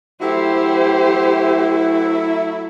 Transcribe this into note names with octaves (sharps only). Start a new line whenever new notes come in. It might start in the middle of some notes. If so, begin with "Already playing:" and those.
F#3 A3 E4 G4 C5